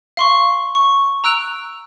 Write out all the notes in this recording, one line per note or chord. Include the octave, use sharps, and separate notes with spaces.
F5 C6 C#6
C#6
A#5 E6 F#6 D7 F7